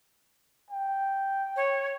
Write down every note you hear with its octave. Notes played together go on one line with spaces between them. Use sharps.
G5
C#5